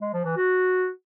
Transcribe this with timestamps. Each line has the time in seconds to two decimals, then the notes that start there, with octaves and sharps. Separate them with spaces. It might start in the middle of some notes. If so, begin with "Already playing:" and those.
0.01 G#3
0.13 F3
0.25 E3
0.37 F#4